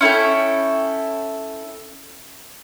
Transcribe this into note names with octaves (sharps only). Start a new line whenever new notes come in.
C#4 E4 A4 G5